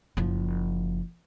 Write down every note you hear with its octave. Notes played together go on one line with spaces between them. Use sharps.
F#1 F3